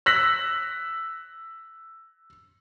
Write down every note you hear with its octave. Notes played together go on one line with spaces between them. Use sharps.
E6 F#6 A#6 B6 F#7